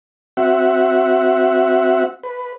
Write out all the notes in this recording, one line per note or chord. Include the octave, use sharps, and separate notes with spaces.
C4 F#4 E5 F#5
B4